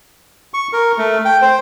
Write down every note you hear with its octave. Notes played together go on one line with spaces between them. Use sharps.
C#6
A#4
A3
G5
C5